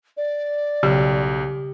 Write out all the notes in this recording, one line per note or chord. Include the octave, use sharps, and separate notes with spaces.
D5
B1 C#3 G4